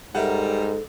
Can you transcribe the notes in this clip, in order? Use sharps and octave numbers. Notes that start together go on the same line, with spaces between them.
G#2 G3 A4 A#4 E5 F#5